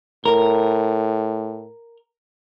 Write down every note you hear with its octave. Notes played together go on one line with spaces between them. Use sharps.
A2 A#4